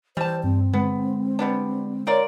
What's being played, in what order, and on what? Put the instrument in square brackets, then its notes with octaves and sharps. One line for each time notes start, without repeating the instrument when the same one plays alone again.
[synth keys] E3 [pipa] G3 A5 [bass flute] C5
[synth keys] G2 [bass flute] C4
[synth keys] D3 G#3 [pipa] B3
[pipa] G3 B3 D4
[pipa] F4 A#4 D5 [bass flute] C#5 [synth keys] D7